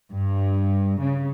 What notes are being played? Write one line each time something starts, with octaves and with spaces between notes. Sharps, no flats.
G2
C#3